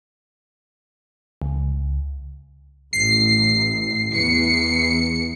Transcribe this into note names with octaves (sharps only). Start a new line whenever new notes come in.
C#2
A1 C7
E2 C#7